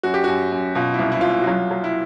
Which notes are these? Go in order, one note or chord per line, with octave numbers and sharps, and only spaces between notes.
F#2 F#4
G4
F#2 F#4
F#2
B2 F4
E4
C2
E4
C2 F4
E4
F#4
F#3 F4
F#3
E4